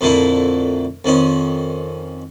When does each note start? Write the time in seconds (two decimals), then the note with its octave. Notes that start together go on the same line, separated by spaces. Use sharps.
0.01 F2 A#2 D3 A3 A#3 E4
1.05 F2 D#3 C#4 C6